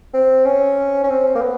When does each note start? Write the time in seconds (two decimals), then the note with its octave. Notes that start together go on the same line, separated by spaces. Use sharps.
0.14 C4
0.45 C#4
1.04 C#4
1.09 C4
1.35 A#3
1.41 B3